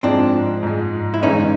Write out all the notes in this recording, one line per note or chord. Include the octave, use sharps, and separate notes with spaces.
G#2 F3 G#3 C4 D4
G#2 F3 G#3
E4
G1 G2 E3 G#3 B3 C#4 D#4